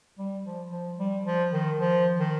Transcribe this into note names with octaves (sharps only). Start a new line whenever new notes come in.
G3
F3
F3
G3
F3
D#3
F3
D#3